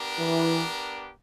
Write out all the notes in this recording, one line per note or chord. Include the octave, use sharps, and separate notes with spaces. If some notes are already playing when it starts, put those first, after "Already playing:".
Already playing: B3 D4 G4 A#4
E3